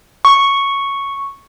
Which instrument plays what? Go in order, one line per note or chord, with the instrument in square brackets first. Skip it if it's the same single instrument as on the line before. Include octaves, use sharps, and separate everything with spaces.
[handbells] C#6